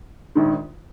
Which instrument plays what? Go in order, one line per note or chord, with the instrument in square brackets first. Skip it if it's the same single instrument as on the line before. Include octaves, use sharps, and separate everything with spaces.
[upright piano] A#1 G#2 D#3